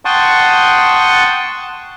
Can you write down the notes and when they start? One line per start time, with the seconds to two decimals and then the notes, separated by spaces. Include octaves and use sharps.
0.05 F#5 G5 A5 C6 C#6 D#6